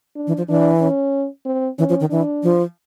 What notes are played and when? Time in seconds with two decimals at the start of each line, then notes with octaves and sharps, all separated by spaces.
0.16 D4
0.27 E3
0.38 F3
0.48 E3 D4
0.81 C#4
1.46 C4
1.79 E3 C#4
1.89 F3
2.00 D#3
2.10 E3 D4
2.43 F3